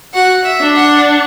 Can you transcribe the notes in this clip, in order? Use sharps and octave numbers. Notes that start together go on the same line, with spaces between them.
F#4 F#5
E5
D4
F#5